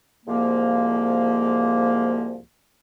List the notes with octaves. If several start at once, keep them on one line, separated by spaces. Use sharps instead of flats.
C2 G#2 F3 A#3